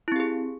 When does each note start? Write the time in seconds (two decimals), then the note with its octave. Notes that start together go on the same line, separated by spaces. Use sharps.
0.08 E4
0.12 C4
0.16 G4
0.20 G#4